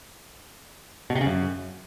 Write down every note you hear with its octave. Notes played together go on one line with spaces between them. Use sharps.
B2
C3
C#3
F#2